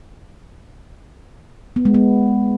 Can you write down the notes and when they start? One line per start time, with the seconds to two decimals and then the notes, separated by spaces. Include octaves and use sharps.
1.76 B3
1.85 G#3
1.94 B3